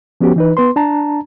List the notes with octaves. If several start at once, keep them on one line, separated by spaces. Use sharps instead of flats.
F3 B3 C#4 F#4 G4
E3 D#4 B4
B3 B4 C6
D4 A5 A#5